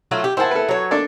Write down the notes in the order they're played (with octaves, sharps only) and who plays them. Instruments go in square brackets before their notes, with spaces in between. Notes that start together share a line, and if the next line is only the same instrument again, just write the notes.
[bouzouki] F#3 A3 F4
G4
[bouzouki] E4 G#4 [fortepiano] C5 F#5 A5
[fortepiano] A4 B4
[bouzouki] F#3 C#5
[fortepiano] D4 A4 D5